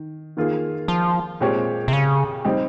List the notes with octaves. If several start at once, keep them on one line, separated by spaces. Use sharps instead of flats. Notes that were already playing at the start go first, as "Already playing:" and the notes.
Already playing: D#3
D#3 A#3 F4 G#4
F3
A#2 G#3 C4 G4 C#5
C3
C#3
G3 C4 D#4 G4